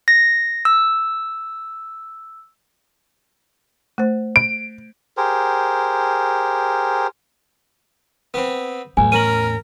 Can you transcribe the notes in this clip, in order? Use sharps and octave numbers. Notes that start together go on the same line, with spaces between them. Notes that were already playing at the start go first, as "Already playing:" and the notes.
A#6
E6
A3 C5
D7
G4 G#4 A#4 C5
B3 C4
B1 E2 A2 G#5
C#4 A#4 D#7 F#7